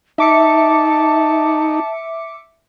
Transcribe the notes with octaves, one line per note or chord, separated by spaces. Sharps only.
D#4 E5 A5 D6 C#7